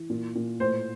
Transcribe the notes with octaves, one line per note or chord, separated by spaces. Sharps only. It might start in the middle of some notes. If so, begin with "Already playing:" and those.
Already playing: E3
A#2
A#2
A2 C5